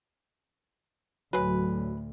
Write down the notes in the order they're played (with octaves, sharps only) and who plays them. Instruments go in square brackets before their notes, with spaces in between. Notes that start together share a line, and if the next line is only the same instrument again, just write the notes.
[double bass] D2 A2 [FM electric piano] F#3 [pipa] G#3 B4